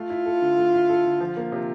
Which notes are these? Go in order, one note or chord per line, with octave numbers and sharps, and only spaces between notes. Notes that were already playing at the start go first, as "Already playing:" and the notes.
Already playing: A3 F4
E4
A4
D3
A3
E4
A4
D3
F3
A#3
C3